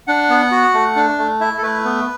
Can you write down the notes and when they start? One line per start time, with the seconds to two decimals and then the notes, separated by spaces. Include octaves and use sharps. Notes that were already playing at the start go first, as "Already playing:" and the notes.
0.07 D4 F#5
0.29 B3
0.51 F#4
0.74 A3
0.96 D4
1.18 A3
1.40 E4 E5
1.58 A4
1.63 A3 B4
1.84 B3